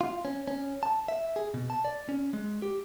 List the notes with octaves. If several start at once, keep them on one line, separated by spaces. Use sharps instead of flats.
F4
C#4
C#4
A5
E5
G#4
B2
A5
D5
C#4
G#3
G4